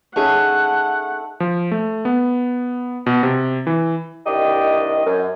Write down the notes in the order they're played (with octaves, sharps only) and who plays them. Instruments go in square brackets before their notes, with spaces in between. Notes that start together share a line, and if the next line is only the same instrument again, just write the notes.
[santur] A3 [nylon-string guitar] C#4 D#4 G#4 [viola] F#5
[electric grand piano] F3
A3
B3
B2
C3
E3
[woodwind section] C2 D#3 D4 G4 D#5
F#2